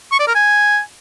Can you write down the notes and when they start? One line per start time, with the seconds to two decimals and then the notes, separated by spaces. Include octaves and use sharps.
0.12 C#6
0.19 D5
0.27 A#4
0.35 G#5